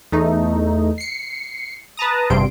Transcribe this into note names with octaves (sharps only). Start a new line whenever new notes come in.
E2 A3 D#4
C7 C#7
B4 A5 A#5 D#6
G#1 E2 G2 C3 C6 D7